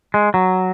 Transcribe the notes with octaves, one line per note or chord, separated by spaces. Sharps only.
G#3
F#3